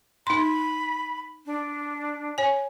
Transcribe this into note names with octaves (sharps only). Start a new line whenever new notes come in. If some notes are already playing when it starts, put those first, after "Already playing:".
D#4 B5 C6
D4
C#5 G#5